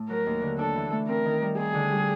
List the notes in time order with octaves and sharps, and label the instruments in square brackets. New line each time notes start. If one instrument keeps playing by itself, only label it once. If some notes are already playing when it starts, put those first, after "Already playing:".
Already playing: [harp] A2 A3
[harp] F#3 [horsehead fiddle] A#4
[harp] D#2
D3
[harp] D4 [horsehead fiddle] A4
[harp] E3
A3
[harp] C4 [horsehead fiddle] A#4
[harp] D#3
G3
[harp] C4 [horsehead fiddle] G#4
[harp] D3
G3